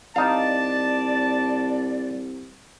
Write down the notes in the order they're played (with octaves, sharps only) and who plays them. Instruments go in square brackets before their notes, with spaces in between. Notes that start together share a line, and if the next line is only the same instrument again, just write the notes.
[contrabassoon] C2 [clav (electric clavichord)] D#4 F5 [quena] D5 [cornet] A5